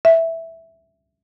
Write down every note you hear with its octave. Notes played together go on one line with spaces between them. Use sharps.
E5